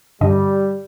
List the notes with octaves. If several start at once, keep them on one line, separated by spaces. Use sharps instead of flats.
G2 D3 G3 D#5